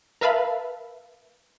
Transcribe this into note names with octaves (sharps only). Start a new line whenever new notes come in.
A#4 B4 E5 F5 A5 B5